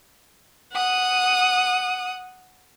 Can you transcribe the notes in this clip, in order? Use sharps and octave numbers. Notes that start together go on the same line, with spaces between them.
F#5 D#6